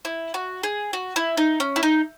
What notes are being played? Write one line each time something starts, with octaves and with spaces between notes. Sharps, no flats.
E4
F#4
G#4
F#4
E4
D#4
C#4
E4
D#4